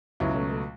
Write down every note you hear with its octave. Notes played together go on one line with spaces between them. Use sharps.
C#2 B2 F#3 C#4 E4
A3 C#4
A3